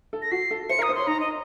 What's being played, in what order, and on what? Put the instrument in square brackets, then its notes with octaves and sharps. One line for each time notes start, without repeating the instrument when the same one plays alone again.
[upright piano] A4
[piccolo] A#6
[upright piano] F#4 [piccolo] C7
[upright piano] A4
[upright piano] C5 [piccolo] C#7
[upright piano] A#4
[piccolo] D#6
[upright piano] C5
[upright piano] C#5 [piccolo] C6
[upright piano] D#4 [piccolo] A#5
[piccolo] D#5